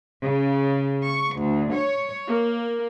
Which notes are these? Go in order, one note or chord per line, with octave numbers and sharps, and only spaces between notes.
C#3
C#6
D2
C#5
A#3